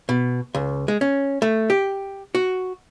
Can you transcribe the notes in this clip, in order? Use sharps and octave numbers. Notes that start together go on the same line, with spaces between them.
B2
C#2
G#3
C#4
A3
G4
F#4